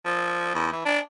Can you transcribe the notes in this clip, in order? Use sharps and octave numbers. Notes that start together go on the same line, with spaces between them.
F3
E2
E3
D4